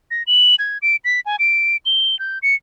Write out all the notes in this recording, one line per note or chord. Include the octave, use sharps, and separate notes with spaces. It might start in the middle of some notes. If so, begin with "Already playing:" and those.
A#6
F#7
G#6
D7
B6
G#5
D7
G7
G6
C#7